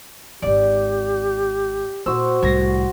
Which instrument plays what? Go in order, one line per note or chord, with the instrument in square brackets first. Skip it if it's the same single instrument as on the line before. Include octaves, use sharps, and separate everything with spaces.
[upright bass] D#1 G#1 [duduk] G4 [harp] D5
[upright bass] A#2 [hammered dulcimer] F#4 C5 [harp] E6
[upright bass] C2 A2 [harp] G#6 A#6 C7